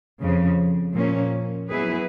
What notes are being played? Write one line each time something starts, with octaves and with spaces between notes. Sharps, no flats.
F2 C#3 F3
A#2 F3 A#3 C#4
F#3 B3 E4 G#4 B4